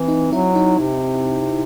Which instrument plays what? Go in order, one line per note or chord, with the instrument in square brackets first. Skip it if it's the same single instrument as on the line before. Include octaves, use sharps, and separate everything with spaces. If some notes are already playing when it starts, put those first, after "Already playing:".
Already playing: [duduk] E3 [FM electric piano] C4
[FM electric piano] D#4
[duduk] F#3 [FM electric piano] E4
[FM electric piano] D#4
[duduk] C3